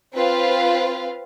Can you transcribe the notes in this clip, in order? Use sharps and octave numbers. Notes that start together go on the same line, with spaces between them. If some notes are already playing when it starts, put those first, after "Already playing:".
C4 F4 B4 F5